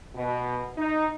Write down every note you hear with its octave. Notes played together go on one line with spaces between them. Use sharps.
B2
D#4